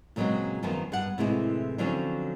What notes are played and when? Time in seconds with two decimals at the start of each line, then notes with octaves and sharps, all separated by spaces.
0.16 A#2 C#3 F#3 G#3 B3 C4
0.63 F#2 D#3 F3 B3
0.92 G2 B3 F#5
1.18 A2 C3 E3 G3 G#3
1.78 D3 F3 F#3 C4 C#4